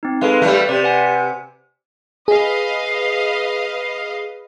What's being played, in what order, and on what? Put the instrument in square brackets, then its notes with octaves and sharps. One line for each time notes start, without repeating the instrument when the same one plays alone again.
[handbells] C4 D#4
[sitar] G#3 [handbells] A4 B4 F5
[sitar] G3 A3
[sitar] C3 [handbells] D5
[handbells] B4 F#5 G#5
[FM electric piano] G#4 [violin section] B4 D#5 F5